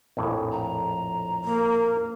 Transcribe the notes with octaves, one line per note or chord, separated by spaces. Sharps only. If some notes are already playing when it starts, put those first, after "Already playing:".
A#1 F2 A2
A#5
A#3